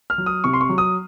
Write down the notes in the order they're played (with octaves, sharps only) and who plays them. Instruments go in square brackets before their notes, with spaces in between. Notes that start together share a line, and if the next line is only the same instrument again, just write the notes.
[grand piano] F6
F#3
D#6
C3 C#6
C6
C#6
F#3
D#6